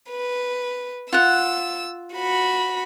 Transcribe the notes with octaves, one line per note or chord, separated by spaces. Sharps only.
B4
F4 F#5 E6
F#4 B5